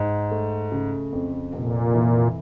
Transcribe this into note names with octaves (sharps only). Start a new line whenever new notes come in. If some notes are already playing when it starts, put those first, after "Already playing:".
Already playing: G#2
A3
C#3
F2
F1 A#2
E3